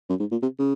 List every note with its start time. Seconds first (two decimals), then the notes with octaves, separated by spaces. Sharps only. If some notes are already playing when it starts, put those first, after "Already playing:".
0.09 F#2
0.20 G#2
0.31 A#2
0.42 C3
0.59 C#3